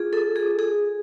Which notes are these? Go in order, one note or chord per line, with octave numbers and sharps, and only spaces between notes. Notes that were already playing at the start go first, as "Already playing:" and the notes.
Already playing: F4 G#4
A4
G#4
G#4